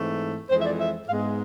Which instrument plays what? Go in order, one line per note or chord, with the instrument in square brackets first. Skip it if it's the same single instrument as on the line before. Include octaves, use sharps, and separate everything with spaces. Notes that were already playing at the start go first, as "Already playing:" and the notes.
Already playing: [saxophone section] G#2 E3 A3 C4
F2 E3 G#3 C5
E5
D5
E5
G#2 G#3 B3 F5